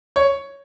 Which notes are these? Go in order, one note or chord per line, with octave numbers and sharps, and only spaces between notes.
C#5